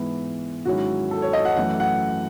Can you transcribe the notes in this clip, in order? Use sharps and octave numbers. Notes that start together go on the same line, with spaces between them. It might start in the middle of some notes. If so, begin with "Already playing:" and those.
Already playing: G#2 E3 B3 E4
G#2 D#3 F#3 C#4 E4 F#4
A4
C#5
D#5
F#5
F#2 E3 A3 F#5
F#5